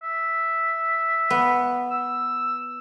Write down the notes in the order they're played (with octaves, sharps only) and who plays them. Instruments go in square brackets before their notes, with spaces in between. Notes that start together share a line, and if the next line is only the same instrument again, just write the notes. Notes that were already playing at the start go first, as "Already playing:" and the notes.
[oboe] E5
[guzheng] B3
[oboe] E6